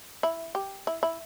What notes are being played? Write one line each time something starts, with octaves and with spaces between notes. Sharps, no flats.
E4
G4
E4
E4